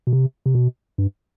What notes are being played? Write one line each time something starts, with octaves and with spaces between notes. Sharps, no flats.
B2
C3
C3
B2
G2